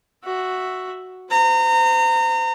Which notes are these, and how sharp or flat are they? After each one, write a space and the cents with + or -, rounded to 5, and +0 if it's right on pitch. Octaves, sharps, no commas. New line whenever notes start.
F#4 +0 E5 +0
C5 -35 A#5 -30